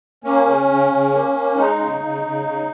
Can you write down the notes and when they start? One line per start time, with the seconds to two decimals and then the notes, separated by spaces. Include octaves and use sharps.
0.24 A#3 C#4
0.46 C#3
0.68 C#3
0.90 C#3
1.12 A#3
1.34 A#3
1.56 G#3 D#4
1.78 C#3
2.00 C#3
2.22 C#3
2.44 C#3